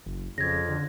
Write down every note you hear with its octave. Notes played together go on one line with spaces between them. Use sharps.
F#1
F2 C#3 G#6 A#6
D3